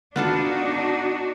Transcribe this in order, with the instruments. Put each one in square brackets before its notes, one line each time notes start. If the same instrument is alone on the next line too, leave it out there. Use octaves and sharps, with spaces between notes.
[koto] B3 F4 A4 [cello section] D4 D#4 F#4